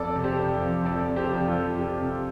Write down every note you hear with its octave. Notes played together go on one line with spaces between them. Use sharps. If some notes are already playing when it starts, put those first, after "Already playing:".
Already playing: F2 A4 D5
C3
G4 C5
F2
F3
F2 A4 D5
C3
G4 C5
F2
F4 A4
F3
F2 G4
C3